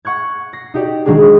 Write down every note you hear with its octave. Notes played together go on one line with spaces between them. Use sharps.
F#5 C#6 F#6 G#6
A#6 C7
D#4 F#4 G4 D5
D#3 F#3 G#3 D4 G#4